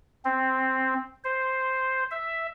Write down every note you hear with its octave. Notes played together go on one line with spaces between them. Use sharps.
C4
C5
E5